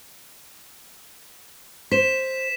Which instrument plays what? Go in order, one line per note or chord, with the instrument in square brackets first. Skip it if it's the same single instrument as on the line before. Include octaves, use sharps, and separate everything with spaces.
[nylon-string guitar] C5 [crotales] B6 E7